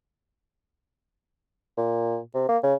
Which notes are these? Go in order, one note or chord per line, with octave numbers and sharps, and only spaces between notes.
A#2
C3
A#3
C#3